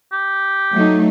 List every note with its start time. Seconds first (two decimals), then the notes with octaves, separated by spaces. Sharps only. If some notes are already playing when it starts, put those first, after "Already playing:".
0.12 G4
0.72 F#3 A3 D#4